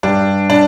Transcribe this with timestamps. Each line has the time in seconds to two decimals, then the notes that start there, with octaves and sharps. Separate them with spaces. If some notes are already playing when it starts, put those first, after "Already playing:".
0.03 G2 D4
0.50 D4